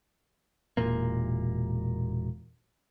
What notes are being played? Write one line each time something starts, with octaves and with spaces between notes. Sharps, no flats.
E1 A#2 A#3